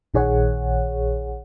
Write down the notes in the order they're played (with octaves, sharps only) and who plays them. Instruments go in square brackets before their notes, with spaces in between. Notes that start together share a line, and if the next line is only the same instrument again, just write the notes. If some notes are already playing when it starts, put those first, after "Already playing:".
[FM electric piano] A#1 D#3 G#4 C#5 F#5